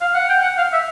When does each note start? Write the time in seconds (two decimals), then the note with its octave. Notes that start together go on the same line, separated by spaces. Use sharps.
0.01 F5
0.14 F#5
0.29 G5
0.42 F#5
0.58 F5
0.72 E5